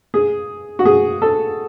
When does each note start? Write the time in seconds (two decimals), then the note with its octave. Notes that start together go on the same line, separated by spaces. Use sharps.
0.14 G#4
0.79 F#4
0.85 G#4
1.22 A4